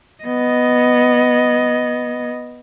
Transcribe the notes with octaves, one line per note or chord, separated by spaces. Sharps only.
B3 D#5